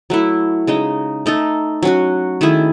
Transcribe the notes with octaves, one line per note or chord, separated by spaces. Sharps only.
F#3 A3 E4
C#3 G#3 D#4
A3 D#4 A4
F#3 C#4 F#4
D#3 A3 E4 G#4